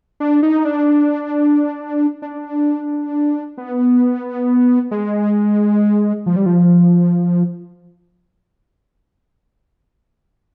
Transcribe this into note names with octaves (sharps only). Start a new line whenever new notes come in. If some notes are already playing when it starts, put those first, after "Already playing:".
D4
D#4
D4
D4
B3
G#3
F3
G3
F3